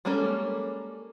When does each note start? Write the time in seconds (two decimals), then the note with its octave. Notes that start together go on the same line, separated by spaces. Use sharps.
0.05 G3 G#3 A#3 C#4 A4